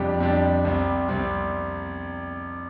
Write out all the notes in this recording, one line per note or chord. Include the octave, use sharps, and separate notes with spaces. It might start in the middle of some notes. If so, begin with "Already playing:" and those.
Already playing: F2 C3 G3 D4 G4
F2 C3 G3 D4 G4
C2 C3 G3 C4
C2 C3 G3 C4